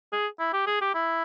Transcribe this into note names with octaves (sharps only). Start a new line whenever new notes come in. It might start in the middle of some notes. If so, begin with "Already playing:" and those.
G#4
E4
G4
G#4
G4
E4